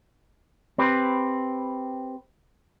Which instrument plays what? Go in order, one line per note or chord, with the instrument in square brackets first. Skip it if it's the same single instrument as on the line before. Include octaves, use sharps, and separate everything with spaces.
[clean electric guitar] C4 G4 B4